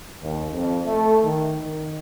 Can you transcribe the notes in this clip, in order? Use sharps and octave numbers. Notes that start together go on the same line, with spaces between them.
D#2
F2
A3
D#3
D#3